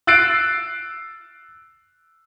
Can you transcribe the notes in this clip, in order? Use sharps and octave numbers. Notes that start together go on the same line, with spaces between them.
E6 F#6 A6 C7 D7